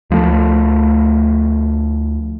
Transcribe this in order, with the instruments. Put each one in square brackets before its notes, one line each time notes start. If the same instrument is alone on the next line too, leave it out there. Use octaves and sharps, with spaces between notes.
[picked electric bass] D2 F3 F#3 A3